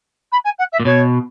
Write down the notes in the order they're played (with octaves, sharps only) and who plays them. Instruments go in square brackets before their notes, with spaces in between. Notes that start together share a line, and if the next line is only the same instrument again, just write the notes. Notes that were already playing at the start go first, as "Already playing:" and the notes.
[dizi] B5
G#5
F#5
E5
[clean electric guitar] A#2
[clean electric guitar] B2 [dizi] C#5